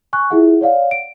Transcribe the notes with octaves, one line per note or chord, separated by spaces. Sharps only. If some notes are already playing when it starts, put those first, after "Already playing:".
G#5 C#6 F#6
E4 F4 G#4 E5 F#5
C#5 D5 F5 F#5
D7